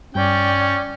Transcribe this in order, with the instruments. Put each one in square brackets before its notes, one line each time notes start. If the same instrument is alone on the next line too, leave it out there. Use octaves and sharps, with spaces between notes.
[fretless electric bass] G2 [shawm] C#4 [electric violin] D5 G5